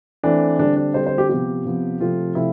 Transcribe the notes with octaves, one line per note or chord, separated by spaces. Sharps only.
E3 A3 C4 D4
D3 G3 C4 D4
D4
D3 G3 C4 C5
C5
G4
C3 F3 B3 G4
C3 F3 B3
C3 F3 A3 C4 F4
C3 F3 A3 C4 E4